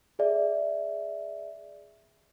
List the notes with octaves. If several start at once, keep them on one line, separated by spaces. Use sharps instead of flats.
G#4 D5 E5